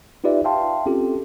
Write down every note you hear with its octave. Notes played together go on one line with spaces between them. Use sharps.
D#4 F4 G4 B4 D5 E5
E5 F5 G5 A5 C6
C4 C#4 F4 G4 A4